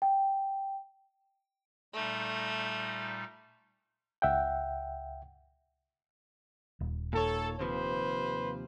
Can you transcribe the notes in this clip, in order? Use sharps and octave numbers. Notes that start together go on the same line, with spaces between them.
G5
A#2 G3 A3 D#4
C#2 E5 F#5 G5
D#1
A#2 D#3 A4 C#5
D#2 C3 F3 B4 C5